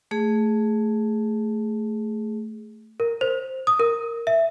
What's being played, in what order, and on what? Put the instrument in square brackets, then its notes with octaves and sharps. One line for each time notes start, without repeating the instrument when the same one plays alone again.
[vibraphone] A3 G#4
[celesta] A#4
C5
D#6
A#4
E5